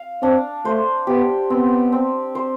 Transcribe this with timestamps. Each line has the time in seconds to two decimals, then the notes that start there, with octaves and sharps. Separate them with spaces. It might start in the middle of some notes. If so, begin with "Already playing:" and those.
Already playing: F5
0.22 C4 D4
0.65 A3 C5
1.07 B3 G4
1.50 B3 C4
1.92 C4
2.35 C5